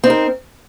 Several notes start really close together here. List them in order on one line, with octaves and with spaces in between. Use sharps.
C4 D#4 A#4